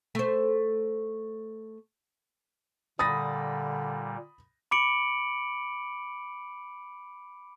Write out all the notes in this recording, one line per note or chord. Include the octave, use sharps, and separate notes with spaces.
A3 C5
A#2 D3 G3 B5 D#6 A6 A#6
B5 D6 C#7 D7 F#7